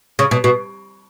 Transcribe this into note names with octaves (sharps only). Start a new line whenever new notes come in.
C#3
B2
B2